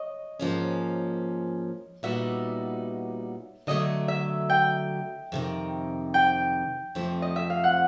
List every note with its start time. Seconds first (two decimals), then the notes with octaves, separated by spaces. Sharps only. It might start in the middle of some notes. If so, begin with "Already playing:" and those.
Already playing: C#5 D#5
0.40 G#2 F3 A#3 C#4
2.03 A#2 G3 B3 D#4 F#4 E5
3.67 D3 F#3 A3 D#5
4.08 E5
4.50 G5
5.32 F2 C3 D#3
6.14 G5
6.95 F2 C3 F3 A3
7.22 D#5
7.36 E5
7.50 F5
7.64 F#5